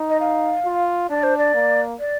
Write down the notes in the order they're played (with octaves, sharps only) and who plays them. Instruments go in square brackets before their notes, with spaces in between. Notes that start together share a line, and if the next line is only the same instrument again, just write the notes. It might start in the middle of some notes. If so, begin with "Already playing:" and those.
Already playing: [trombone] D#4
[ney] D#5
F5
[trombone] F4
[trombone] D4 [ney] D5
[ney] C5
D5
[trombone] A#3
[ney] D5